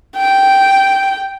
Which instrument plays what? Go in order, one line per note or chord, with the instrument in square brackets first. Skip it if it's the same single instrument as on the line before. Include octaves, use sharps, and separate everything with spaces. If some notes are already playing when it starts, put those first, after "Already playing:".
[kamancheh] G5